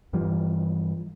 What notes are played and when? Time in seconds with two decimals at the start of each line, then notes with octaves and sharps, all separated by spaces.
0.13 G2 E3 F3 G3